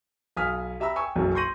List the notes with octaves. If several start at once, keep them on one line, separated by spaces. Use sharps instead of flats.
B1 F5 G#5 D#6 F6 B6
G4 E5 A#5 B5 E6
G5 G#5 C#6 E6
F#1 B1 F#2 F#3
C6 C#6 G6 A#6 D#7 F#7